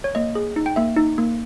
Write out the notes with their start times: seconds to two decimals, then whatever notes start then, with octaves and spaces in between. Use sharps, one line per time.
0.04 C#5
0.15 A#3 D#5
0.35 G#4
0.56 D#4
0.66 G5
0.76 A#3 E5
0.96 D#4
1.18 A#3